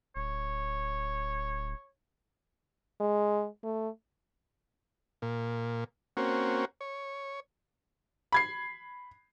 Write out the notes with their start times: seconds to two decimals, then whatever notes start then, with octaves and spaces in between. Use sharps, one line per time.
0.16 D1 C#5
3.00 G#3
3.63 A3
5.22 A#2
6.17 A#3 C4 C#4 F#4
6.81 C#5
8.32 B5 G#6 C7